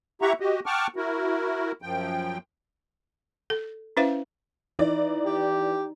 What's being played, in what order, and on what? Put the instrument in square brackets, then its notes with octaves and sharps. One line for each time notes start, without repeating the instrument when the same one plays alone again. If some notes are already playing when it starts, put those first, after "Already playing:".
[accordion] E4 G4 E5 F#5 A#5 C#6
F#4 G4 D#5
F#5 G5 A5 C#6 D6 F6
E4 F#4 A#4
F#2 F3 G5
[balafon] A4
C#4 E4 B4 C5 E5 F5
[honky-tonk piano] E3 D5 [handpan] D#4
[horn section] G4